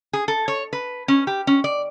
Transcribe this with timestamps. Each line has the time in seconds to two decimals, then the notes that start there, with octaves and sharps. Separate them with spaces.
0.13 G#4
0.28 A4
0.48 C#5
0.73 B4
1.08 C#4
1.27 G4
1.47 C#4
1.64 D5